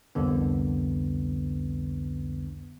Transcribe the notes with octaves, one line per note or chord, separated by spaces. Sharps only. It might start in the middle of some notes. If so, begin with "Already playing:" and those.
C2 F2 D3 B3